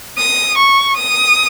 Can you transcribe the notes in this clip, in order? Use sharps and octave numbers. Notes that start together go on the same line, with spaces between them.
D#6
C#6
D#6